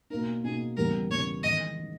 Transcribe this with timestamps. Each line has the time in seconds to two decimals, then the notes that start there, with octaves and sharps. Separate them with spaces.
0.10 B2 A#3 D#4 A#4
0.44 B2 A#3 D#4 G#4
0.77 E2 C#3 G3 B3 A#4
1.10 E2 C#3 G3 B3 C#5
1.43 E2 D#3 G#3 D#5
1.77 D#3 G#3